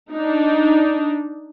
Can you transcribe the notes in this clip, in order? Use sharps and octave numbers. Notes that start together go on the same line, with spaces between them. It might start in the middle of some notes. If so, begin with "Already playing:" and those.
D4 D#4